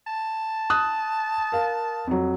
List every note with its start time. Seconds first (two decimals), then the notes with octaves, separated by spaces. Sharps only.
0.07 A5
0.70 D#6 F#6
1.52 A#4 F5
2.07 F2 F#3